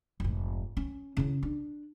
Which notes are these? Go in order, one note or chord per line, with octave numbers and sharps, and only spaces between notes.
F1 G#2
C#4
C#3 E4
D4